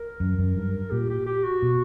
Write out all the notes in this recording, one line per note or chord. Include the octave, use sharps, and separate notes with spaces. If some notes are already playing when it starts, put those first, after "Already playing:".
Already playing: A#4
F#2
F#2
G2
A#2 G4
G4
G4
F#4
B2